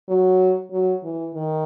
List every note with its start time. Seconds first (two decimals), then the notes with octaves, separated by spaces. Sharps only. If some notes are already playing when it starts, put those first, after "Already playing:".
0.09 F#3
0.72 F#3
1.03 E3
1.35 D#3